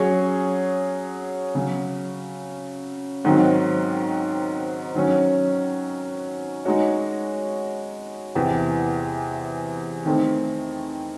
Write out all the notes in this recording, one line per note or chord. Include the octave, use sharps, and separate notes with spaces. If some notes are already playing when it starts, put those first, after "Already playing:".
Already playing: F#3 C#4 G#4 C#5
C#3 F#3 C#4
G#2 D#3 F#3 C4
D#3 F#3 C#4
G#3 D#4 F#4 C#5
E2 C3 E3
D#3 A3 C4